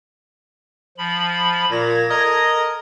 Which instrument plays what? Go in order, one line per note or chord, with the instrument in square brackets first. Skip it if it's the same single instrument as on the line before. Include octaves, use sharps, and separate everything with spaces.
[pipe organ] F3 B5
[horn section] A#2 [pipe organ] G#6 A#6
[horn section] A4 A#4 D#5